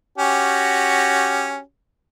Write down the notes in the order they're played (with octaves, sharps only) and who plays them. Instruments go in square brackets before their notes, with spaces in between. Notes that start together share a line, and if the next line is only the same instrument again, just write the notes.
[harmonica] C#4 F#4 G4